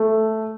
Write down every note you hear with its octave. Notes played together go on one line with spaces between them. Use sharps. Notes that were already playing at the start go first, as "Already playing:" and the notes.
Already playing: A3